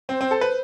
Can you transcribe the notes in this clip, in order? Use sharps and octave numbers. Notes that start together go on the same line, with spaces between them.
C4 C5
C4
A4
B4